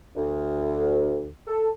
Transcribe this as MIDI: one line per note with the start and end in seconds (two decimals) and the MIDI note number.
0.16 1.28 38
1.47 1.69 69